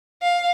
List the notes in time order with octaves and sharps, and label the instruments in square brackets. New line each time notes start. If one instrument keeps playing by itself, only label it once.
[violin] F5